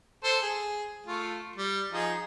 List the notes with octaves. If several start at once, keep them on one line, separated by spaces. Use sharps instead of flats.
A4 C5
G#4
A3 F4
G3
F3 D#4 G#4